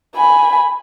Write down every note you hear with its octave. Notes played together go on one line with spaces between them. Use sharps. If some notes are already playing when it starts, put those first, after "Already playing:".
G#5 B5